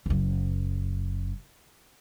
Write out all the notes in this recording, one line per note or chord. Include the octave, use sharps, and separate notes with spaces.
F#1 F#2